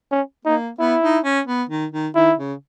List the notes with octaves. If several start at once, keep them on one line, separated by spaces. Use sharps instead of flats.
C#4
A#3 D#4
B3 E4
D#4
C#4
B3
D#3
D#3
D#3 E4
C#3